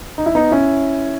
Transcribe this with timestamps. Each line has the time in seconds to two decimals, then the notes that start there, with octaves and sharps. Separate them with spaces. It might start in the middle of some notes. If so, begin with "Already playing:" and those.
0.18 D#4
0.26 E4
0.35 B3 D#4
0.51 C#4 E4